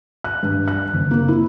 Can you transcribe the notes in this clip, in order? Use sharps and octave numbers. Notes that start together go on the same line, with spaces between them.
F#6
G2
F#6
F#1
A#3
E4